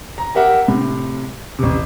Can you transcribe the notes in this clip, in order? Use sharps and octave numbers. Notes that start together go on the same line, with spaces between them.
A#5
G4 A#4 E5 F#5
A2 C3
A1 C3